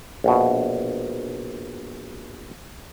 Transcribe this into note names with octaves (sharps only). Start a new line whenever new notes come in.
A#1 B2